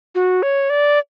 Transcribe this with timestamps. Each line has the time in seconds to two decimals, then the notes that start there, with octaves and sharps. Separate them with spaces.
0.15 F#4
0.43 C#5
0.70 D5